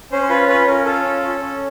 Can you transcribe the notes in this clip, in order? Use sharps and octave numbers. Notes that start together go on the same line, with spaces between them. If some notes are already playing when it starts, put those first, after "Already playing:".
C#4 C5
C5
F4 B4
C#4 B4
C#4 A#4
F4 A4
C#4
C#4
C#4